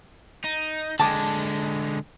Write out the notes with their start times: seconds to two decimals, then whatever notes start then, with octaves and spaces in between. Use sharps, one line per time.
0.44 D#4
0.99 D3 G#3 A5 D6